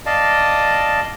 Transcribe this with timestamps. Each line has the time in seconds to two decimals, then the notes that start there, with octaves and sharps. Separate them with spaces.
0.06 D5 D#5 F5 A5